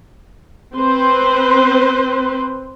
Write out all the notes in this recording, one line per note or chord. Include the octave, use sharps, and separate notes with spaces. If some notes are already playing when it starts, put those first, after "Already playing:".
C4 B4 C5